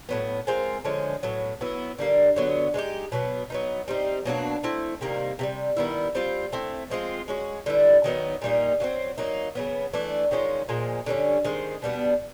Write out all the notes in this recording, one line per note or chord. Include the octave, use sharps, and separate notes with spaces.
A2 F#3 B3
G#3 C4 F4 A#4
D3 F3 G#3 C#4
A2 F#3 B3
F#3 B3 E4
D3 G3 A#3
D3 F#3 B3
G#3 C4 D#4 G4
B2 F#3 B3
F#3 B3 D#4
G3 C4 D#4
B2 F#3 A#3 D4
A3 C4 E4
C3 D#3 G3 A#3
C3 E3 G3
D#3 G3 B3 E4
G3 C4 F4
A3 C4 E4
F3 G#3 C4 F4
G#3 C#4 F#4
D3 G3 B3 E4
D#3 F#3 B3 D#4
A#2 G3 A#3 D#4
F#3 A3 C4
F#3 A#3 D#4
C#3 F#3 B3
E3 A3 D4
D#3 G#3 C#4 F4
A#2 F3 G#3
D3 G3 A#3 C#4
D#3 G#3 C4
B2 G3 B3 D4